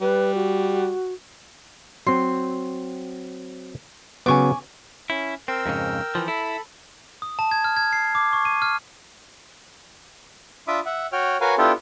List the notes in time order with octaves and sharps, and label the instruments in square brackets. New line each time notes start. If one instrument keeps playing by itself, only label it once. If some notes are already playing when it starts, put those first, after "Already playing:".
[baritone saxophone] G3 [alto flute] B4
[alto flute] F#4
[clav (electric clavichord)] F#3 C4 [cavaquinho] C6
[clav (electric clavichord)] C#3 F#3 B3 [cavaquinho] G#5 C#6 D6
[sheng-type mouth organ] C#4 [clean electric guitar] E4
[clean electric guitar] C4 [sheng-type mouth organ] A#4 G5 E6
[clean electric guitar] F2 G#2 C#3
E3 F3
[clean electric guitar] E4 [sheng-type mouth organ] A4 B5
[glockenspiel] D#6
A5
G#6
F6
G#6
C7
D6
C#6
D#7
F6
[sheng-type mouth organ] D4 F4 E5 B5 D6 D#6
E5 F#5
F#4 C#5 G5 F6
F#4 A#4 B4 C#5 F5 G#5
B3 D4 E4 F4 G4 A4